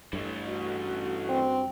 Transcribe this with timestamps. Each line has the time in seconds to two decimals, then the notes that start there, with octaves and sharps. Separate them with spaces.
0.13 G2 E3 A3
0.47 F#4
1.29 C4